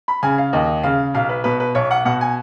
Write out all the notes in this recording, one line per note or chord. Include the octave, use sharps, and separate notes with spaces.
B5
C#3 G#5
F5
D#2 D#5
C#3 F5
B1 F5
B4
B2 B4
B4
B1 C#5
F#5
B2 F#5
G#5